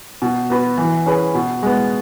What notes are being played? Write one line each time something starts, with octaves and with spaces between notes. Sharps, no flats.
B2
B3 F#4 B4
E3
C#4 G#4 B4
B2
G#3 B3